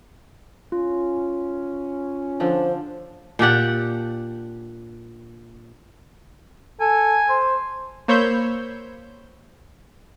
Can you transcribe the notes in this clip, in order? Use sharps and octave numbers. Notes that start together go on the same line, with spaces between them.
C#4 F4
D3 F3 D4 C5
A#2 D4 G4 F#5
A4 G#5
C5
A#3 C5 C#5 B5 E6 G6